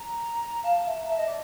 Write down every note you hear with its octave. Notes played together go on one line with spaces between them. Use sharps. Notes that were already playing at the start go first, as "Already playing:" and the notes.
Already playing: A#5
F5 A5
E5
A#5
E5 A5
D#5
D5